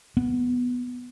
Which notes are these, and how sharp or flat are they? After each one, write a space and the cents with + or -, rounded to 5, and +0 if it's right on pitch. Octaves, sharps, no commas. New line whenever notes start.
B3 +0